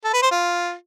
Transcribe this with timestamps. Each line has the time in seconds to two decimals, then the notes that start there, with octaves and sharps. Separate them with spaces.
0.04 A4
0.13 B4
0.22 C5
0.31 F4